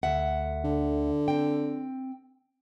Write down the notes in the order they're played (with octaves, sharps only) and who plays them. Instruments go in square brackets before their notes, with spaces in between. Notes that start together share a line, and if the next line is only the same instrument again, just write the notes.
[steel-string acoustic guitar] D2 E5 F#5
[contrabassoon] D3
[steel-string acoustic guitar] C4 G5